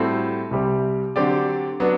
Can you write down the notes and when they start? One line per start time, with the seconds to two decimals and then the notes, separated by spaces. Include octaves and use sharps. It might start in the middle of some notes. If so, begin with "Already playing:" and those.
Already playing: A2 G3 C4 F#4 A4
0.51 C2 C3 G3 C4 G4
1.16 D3 F#3 C4 G4 D5
1.80 F#3 B3 D4